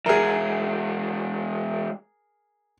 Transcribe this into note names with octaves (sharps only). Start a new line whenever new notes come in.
E3 G#3 G#4 A#4